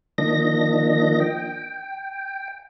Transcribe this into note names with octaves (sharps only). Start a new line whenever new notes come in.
D#3 F3 A#3 D4 D#5 A#6
G5